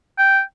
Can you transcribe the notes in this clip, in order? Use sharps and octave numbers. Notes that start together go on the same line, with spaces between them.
G5